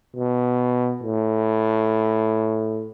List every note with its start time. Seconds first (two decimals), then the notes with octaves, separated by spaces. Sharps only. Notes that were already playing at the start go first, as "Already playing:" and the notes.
0.16 B2
1.03 A2